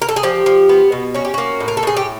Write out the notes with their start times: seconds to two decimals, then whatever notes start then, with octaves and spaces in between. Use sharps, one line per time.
0.02 A#4
0.09 A4
0.16 G#4
0.23 F3 G4
0.46 F3
0.69 B3
0.92 B2
1.14 C#4 F#4
1.25 G4
1.34 A#3 F#4
1.60 A2
1.68 A#4
1.77 A4
1.83 A2 G#4
1.97 G4